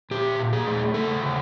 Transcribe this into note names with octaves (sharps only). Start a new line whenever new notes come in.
A#2 G4
A#2
G#4
A3
C#3 A4
C#3